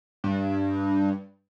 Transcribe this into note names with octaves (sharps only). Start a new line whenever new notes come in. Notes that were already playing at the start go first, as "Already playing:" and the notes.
G2